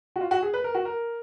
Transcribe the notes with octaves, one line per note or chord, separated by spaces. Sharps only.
F#4
F4
F#4
G#4
B4
A#4
F#4
A#4